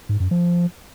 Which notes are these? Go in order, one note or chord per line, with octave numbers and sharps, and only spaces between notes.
G#2
F#2
F3